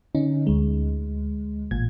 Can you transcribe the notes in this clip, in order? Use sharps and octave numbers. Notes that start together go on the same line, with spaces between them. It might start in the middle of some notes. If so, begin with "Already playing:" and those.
D3 C#4 D#4
D2 G#3
A1 A#2 G#6